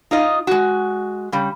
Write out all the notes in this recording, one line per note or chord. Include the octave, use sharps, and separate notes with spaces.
D#4 F4 D#5
G#3 F#4
C#3 G3